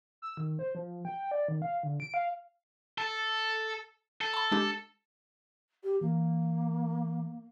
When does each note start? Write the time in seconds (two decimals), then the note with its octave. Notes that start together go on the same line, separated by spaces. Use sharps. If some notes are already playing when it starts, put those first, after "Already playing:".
0.22 E6
0.37 D#3
0.59 C5
0.75 F3
1.05 G5
1.31 D5
1.48 D#3
1.62 F5
1.83 D3
2.00 D7
2.14 F5
2.98 A4
4.21 A4
4.34 A5 B5
4.52 G#3 D4 G4
5.84 G4
6.01 E3 A#3